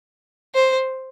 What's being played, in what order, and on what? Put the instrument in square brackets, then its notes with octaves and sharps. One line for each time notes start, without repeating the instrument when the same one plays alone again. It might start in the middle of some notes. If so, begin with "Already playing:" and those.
[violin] C5